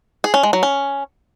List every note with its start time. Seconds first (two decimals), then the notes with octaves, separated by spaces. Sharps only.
0.24 G#4
0.34 C#4
0.43 G#3
0.53 F#3
0.63 C#4